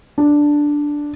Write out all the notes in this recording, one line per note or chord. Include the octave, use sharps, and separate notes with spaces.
D4